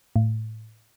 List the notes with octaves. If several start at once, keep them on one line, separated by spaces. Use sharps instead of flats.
A2